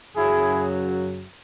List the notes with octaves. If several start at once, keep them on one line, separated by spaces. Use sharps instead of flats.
F#2 C#3 F#3 E4 G#4